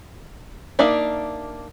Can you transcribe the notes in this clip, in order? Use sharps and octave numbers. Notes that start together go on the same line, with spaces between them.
A#3 D4 D#4 D5 E5